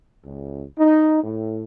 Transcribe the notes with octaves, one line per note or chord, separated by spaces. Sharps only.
C#2
D#4
A2